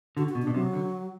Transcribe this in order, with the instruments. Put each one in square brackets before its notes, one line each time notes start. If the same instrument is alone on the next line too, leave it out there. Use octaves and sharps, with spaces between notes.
[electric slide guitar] D3 [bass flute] F#4
[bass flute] F#4
[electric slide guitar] B2
[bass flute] D4
[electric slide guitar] B2
[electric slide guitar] C3 [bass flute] F#3
[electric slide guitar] D3